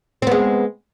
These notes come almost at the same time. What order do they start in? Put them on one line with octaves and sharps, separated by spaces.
C4 B3 G#3